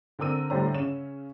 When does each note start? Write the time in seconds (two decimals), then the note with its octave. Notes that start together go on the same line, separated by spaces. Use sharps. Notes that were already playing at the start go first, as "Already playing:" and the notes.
0.19 D3 C4 A#4 E6 D#7
0.50 A2 D3 G3 C5 C#5 A#5
0.74 C#3 C#4 E7